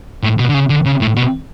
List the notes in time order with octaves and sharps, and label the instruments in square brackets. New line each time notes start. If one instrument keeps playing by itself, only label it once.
[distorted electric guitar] A2
B2
D3
C#3
D3
C#3
A2
B2